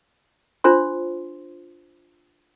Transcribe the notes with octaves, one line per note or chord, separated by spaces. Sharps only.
D4 F4 C5 C6